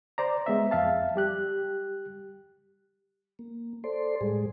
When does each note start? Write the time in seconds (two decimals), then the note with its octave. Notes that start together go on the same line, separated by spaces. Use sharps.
0.18 C5 D5 A#5
0.46 G#3 B3 E5
0.71 F2 E5 F5 A5
1.16 G3 G4 F#6
3.39 A#3
3.84 A4 C5 D5 C6
4.21 A2 G3 G#3 G#4